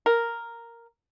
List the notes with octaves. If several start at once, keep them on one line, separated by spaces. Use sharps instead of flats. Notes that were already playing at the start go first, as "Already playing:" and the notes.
A#4